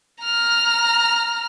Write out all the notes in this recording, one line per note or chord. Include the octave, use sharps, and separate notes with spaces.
A#5 F6